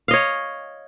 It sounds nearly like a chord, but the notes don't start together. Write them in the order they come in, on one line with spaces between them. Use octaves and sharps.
F5 D#5 C#5